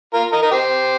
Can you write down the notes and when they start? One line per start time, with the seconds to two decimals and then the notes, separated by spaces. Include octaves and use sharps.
0.13 F4 A#4
0.32 A#4 D#5
0.42 A#4 D#5
0.51 G4 C5